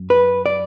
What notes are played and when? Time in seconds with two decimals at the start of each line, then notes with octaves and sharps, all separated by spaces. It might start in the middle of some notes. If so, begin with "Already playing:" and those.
Already playing: F#2
0.10 B4
0.46 D5